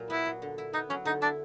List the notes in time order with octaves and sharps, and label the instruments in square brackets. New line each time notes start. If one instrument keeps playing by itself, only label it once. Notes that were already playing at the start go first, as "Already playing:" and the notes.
Already playing: [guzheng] A#2 F#3
[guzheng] B3 [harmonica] E4
[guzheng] F#3
D3
E4
[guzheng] B3 [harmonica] D#4
[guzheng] F#3 [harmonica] C#4
[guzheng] D3 [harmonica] D#4
[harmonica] D4 [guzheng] E4